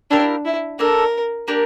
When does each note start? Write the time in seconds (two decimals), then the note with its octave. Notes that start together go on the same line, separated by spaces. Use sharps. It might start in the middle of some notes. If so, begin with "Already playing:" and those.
0.11 D4 E4 G4 A#4 F5
0.45 E4
0.79 A#3 D4 A4 A#4
1.48 A#3 D4 G4 A#4